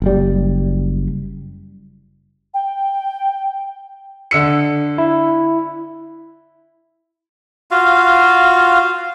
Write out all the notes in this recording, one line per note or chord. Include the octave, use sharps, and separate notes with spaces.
F#1 G3
G5
D3 E6 C#7
E4
F4 F#4 F5